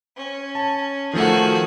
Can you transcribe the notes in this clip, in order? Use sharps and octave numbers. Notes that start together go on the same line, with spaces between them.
C#4
A5
D#3 F3 A3 F#4 G#4